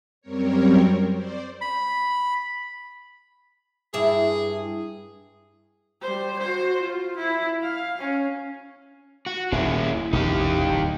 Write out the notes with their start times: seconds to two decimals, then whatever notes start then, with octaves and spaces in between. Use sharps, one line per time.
0.21 F#2 G3 C4 A#4 C#5
1.12 C5 D5
1.61 B5
3.94 G2 E4 G#4
6.02 G3 C5
6.39 F#4 C5
6.80 F4
7.17 E4
7.62 F5
7.98 C#4
9.26 F#4
9.52 D#1 A#3 C#4 E4 G#4
10.13 E1 A1 C3 D#4 G4
10.68 D1